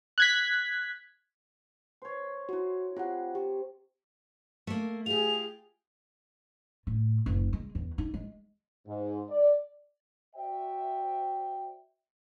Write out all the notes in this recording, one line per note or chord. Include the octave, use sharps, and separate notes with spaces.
F#6 G#6 B6
C5 C#5
E4 F#4
C3 F4 F#5
G4
A3 A#3
F4 G4 G#4 F7
A2
F#1
G#3
E2
D#4
G#3
G#2
D5
F#4 C5 D5 E5 G5